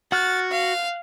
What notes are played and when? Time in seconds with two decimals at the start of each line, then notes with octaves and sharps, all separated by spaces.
0.12 F#4 F#5 F6 F#6 A6
0.51 F5